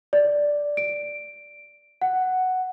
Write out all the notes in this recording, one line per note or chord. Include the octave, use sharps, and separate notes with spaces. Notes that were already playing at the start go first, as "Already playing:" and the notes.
D5
D7
F#5